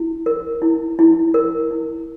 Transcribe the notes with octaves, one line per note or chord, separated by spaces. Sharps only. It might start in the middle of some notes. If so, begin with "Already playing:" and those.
Already playing: E4
A#4
E4
E4
A#4
E4